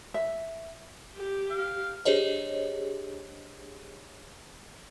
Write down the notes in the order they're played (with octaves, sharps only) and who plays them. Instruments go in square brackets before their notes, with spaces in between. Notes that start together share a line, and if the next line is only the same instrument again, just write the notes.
[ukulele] E5
[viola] G4
[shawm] F5
[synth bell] D4 G4 G#4 C5 C#5 D#5